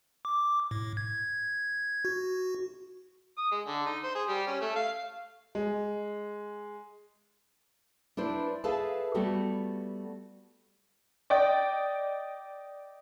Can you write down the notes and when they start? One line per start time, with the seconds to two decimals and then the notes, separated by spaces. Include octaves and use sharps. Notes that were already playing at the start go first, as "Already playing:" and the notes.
0.25 D6
0.71 A2
0.97 G#6
2.05 F#4
3.37 D#6
3.51 G#3
3.66 D3
3.86 D#4
4.03 C5
4.15 G#4
4.28 G3
4.47 C#4
4.61 A3
4.75 F5
5.55 G#3
8.17 D4 E4 B4 C5
8.64 G#4 A4 B4 E5 F5 A5
9.14 G3 A3 B3 F#4 G4
11.30 D5 D#5 G5